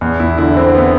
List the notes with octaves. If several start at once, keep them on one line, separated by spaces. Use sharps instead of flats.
E2
E2 E4
D3 E4
D3 C4
B3